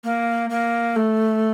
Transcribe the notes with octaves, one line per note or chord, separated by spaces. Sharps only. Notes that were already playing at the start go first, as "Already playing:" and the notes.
A#3
A#3
A3